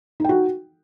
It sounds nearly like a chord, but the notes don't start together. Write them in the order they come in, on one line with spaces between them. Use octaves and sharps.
D#4 G5 F#4